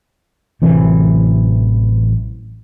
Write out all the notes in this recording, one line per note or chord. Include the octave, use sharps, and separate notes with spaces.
A1 C3 E3 F#3